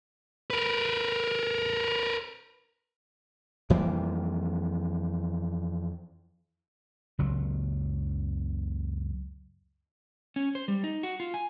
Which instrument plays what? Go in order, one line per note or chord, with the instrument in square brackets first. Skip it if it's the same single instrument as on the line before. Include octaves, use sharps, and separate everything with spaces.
[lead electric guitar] A#4 B4
[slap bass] F2 E3 G3 A#3
F#1 C#2 F#3
[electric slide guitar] C#4
C5
G3
D#4
F#4
F4
G#5